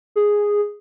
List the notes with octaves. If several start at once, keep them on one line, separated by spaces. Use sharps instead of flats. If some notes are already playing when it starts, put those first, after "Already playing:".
G#4